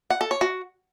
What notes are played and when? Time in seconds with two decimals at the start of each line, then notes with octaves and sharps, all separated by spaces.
0.10 F#5
0.21 A4
0.31 C#5
0.41 F#4